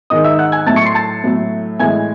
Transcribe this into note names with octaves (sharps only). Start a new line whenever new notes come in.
G#2 D#3 G#3 D#5 D#6
E5 E6
F#5 F#6
G#5 G#6
A2 F#3 A3 A5 A6
C#6 C#7
C6 C7
A5 A6
A2 F#3 A3
A2 E3 G#3 G#5 G#6